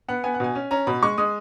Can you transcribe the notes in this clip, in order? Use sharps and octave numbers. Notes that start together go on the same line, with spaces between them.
B3 F#5
B3 G#5
F#5
B2 G#5
C#4
C#4 A#5
B2 B5
G#3 C#6
G#3 D#6